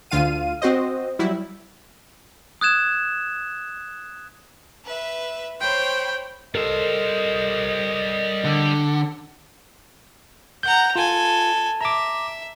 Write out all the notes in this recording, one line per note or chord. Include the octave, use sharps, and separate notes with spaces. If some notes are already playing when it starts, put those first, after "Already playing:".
D2 D3 F4 F5 D#7
C4 F#4 C5 D#5
F#3 G3 E4
D#6 F#6 G#6 E7
B4 E5
C5 C#5 G5 B5 C6
G3 A4 A#4 C5 D#5
D3
F#5 A#5 G6
F4 A4 G#5
E5 A#5 D6